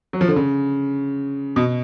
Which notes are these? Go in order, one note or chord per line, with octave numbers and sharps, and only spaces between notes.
F#3
F3
D3
C#3
B2